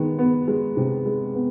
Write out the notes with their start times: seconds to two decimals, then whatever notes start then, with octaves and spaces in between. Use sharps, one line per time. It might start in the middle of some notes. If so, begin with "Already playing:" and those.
Already playing: D#3 G#3 B3
0.19 B3
0.48 G#3
0.77 C3
1.06 G#3
1.35 B3